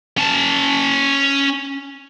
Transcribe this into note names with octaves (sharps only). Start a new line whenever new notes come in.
C#4 A5